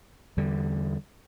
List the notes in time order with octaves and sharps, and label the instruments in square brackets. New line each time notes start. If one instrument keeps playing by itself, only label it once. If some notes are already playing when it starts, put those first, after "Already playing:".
[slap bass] E2 D3 G3